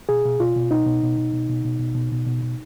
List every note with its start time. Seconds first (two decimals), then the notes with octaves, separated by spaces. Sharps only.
0.09 B2 G#4
0.25 B2
0.40 B2 F4
0.56 B2
0.71 B2 D#4
0.86 B2
1.03 B2
1.18 B2
1.33 B2
1.50 B2
1.65 B2
1.80 B2
1.95 B2
2.12 B2
2.27 B2
2.43 B2